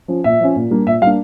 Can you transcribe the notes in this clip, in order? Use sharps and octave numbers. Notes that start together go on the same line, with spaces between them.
F3 C#4
A#2 E5
F3 C#4
A#2
G3 A#3 D4
A#2 E5
G3 A#3 D4 F5